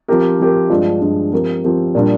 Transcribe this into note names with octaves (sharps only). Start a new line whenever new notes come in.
F3 C4 G4 A#4
F3 C4 G4 A#4
G2 F3 G#3 D4 F4
G2 F3 G#3 D4 F4
F3 C4 G4 A#4
F3 C4 G4 A#4
A#2 G3 D4 F4